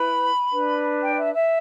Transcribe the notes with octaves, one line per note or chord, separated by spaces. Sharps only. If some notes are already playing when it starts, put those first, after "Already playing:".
Already playing: E4 B4 B5
D4 B4
G5
D5
E5
E5